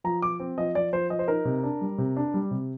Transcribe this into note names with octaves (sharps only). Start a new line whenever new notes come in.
F3 A#5
F3 D6
C4
F3 D#5
F3 D5
F3 C5
F3 D#5
C5
D#4 A#4
C3
D4
G3
C3
D4
G3
C3